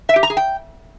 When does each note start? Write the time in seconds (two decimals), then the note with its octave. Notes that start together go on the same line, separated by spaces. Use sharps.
0.09 E5
0.16 G4
0.23 A#5
0.30 G#4
0.37 G5